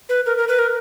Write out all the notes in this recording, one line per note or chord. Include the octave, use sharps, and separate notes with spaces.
B4
A#4
A#4
B4
A#4